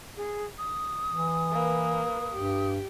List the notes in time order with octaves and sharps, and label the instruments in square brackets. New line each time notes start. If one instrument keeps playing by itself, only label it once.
[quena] G#4
D#6
[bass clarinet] E3
[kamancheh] A#3 B4
[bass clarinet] G2 [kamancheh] G4